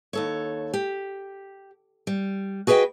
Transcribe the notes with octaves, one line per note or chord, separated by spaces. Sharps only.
D#2 A4 C#5
G4
G3
F#4 G#4 B4 C#5 D#5 G5